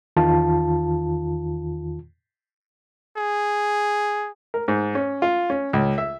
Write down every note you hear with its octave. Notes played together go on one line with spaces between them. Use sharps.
E2 D#3 F4 A5
G#4
A#4
G#2
C#4
F4
C#4
C#2
E5